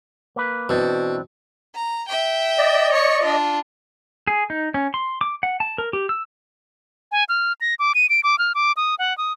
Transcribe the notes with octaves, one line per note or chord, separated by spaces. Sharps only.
A#3 B4
B2 E3 C4 D4
A#5
E5 G5
D5 D#5
C#5 C#6
D4 F4
G#4
D#4
C#4
C6
D6
F#5
A5
A#4
G4
E6
G#5
F6
A#6
D6
D#7
D7
D6
F6
D6
D#6
F#5
D#6